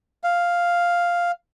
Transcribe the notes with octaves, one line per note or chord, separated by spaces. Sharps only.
F5